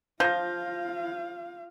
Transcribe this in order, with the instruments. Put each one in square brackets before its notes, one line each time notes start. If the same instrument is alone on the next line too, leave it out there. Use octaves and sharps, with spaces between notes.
[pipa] F3 [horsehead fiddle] F4 F5 [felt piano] G6 A#6